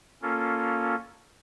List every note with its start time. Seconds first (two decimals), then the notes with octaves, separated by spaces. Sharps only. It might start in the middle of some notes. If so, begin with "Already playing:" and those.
0.22 A#3 C#4 F4 A4